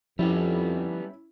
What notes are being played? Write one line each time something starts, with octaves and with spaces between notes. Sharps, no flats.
F2 F3 G3 B3 C#4 E4 G4